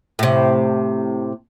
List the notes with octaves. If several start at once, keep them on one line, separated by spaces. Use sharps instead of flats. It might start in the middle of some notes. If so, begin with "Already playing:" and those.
A2 C3